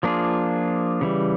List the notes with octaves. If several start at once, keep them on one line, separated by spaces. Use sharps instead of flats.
F3 A#3 D4 F4 G#4
C#3 E3 G3